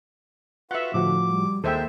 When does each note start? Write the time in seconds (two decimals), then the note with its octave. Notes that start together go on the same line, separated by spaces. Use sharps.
0.71 F4 F#4 B4 E5 F#5
0.94 A2 D3 F3 F#4 D6
1.28 G3
1.64 D#2 G#3 A#3 A4 C5 E5 G5